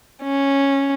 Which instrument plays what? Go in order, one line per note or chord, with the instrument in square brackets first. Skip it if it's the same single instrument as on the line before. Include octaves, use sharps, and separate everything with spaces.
[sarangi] C#4